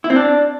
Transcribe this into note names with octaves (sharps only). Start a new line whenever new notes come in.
E4
C4
D4